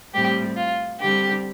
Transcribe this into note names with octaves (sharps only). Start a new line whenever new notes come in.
A2 G3 C4 G4
F4
D3 G3 C4 G4